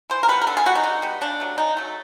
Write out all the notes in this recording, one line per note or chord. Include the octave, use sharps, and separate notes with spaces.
E3 C5
A#4
G3 B3 B4
A#4
D3 A4
G#4
G3 B3 F#4
D#4
D3
G3 B3
C#3 D4
F#3 A3
C#3 D#4
F#3 A3